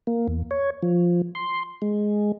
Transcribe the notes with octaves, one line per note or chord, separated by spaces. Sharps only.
A#3
E2
C#5
F3
C6
G#3